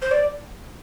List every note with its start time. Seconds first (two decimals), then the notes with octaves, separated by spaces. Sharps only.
0.02 C5
0.11 D5